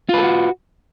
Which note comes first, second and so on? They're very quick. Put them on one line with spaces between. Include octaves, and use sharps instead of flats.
F4 B4 A4 F#4